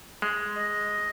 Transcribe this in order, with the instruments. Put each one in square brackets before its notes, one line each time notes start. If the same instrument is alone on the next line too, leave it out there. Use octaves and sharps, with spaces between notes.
[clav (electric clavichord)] G#3
[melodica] D#5